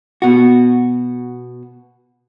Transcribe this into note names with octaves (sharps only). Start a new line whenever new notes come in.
B2 F#4